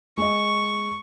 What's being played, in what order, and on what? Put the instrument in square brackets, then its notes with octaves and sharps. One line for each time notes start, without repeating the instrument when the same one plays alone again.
[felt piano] G#3 D#5 [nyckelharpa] C#6